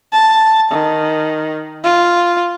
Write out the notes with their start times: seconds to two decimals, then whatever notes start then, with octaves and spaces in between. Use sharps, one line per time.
0.12 A5
0.71 D#3
1.84 F4